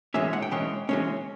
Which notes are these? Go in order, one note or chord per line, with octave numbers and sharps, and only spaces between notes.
E3 G#3 C#4 E5
F#5
G5
E3 G#3 C#4
E3 G#3 C#4